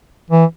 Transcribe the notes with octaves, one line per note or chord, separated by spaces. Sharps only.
E3